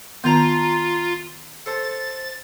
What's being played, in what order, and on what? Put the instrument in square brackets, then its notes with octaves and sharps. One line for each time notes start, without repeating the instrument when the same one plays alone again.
[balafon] D#3 B3 [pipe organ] F4 [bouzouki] A5 A#5
[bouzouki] A4 C5 [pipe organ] A6